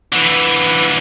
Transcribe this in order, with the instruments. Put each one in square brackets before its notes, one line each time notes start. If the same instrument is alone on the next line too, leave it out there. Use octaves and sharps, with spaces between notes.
[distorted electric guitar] D3 E3